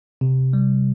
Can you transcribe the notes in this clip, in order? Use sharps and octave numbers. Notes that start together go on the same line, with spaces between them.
C3
G3